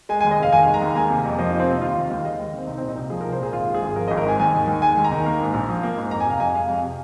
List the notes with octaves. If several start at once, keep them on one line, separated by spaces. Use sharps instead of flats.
G#3 G#5
D#2 G#5
D#5
F1 F5
D#3 G#5
G#3
A#5
D#2
A#3 G#5
C3
F2
F3 D#5
A#3 D#4
C4
C3 D#4
D#2 F4
D#3
D#2 F5
G#3 D#5
D#2
D#3 C4
C2 D#4
A#2 C4
D#4
C2
F3 G#4
C2 A#4
C5
A#2 G#4
G#1 F4
G#2
G#4
G#1
F3 A#4
G#1 D#5
A#4
G#2 G#5
D#2 G#5
D#3
D#2
G#3 G#5
D#2
A#5
D#3
A#3
G#2
A#1
F3
A#3
G#2
F2 A#5
G#5
C3 F5
F2 G#5
G#3 F5
F2
C3